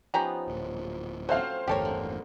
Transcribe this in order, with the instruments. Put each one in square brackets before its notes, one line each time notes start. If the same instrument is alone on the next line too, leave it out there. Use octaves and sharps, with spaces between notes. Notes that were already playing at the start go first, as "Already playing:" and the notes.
[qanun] F3 B3 D#4 [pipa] C#4 G4 A#5
[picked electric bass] D1 A#2
[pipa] F#3 [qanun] A3 C4 C#4 [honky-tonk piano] C5 F5
[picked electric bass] G1 E2 A2 [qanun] A3 A#4 [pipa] G4 A4 C#5
[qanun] D3